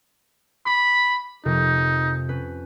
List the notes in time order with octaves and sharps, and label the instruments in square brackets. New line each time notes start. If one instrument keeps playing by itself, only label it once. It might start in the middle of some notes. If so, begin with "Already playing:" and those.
[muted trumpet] B5 [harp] D6 C7
[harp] F2 C3 A#4 [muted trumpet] D#4
[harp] G6
C#4 B4